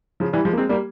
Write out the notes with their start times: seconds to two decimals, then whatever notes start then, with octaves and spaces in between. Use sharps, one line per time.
0.20 C#3 F3
0.33 E3 G3
0.45 F3 G#3
0.53 A#3
0.58 G#3 C4
0.69 G3 A#3